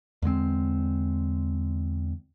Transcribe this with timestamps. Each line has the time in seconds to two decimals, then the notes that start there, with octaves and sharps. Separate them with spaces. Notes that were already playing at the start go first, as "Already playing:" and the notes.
0.22 E2 D3 G#3 C4